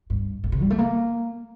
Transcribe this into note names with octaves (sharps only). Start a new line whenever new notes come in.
G2
A2
C3
G3
A3
A#3